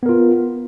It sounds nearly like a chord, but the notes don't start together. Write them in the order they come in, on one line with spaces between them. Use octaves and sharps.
B3 A#4 F4